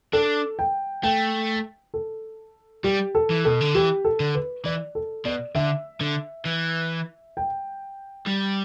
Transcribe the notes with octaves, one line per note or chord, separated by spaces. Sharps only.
D4 A4
G5
A3 G5
A4
G3 G4
A4
E3
B2 A4
D3
E3 G4
A4
D3
B4
E3 D5
A4
B2 D5
D3 E5
D3
E3
G5
G3